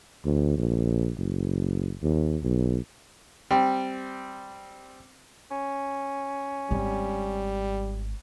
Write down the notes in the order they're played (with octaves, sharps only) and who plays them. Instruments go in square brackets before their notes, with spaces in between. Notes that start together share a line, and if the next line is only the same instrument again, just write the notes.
[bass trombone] D2
A#1
F#1
D#2
B1
[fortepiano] G3 C4
[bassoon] C#4
[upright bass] G#1 [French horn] G3